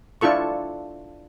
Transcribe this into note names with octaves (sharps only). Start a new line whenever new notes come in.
D4 E4 F4 A4 C#6